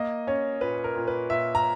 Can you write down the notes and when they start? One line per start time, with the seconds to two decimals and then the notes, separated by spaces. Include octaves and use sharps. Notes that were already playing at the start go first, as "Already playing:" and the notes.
Already playing: A#3 D#5
0.27 C#4 C#5
0.61 A#2 B4
0.84 A#4
0.95 A#2
1.08 B4
1.30 A#2 E5
1.55 A#5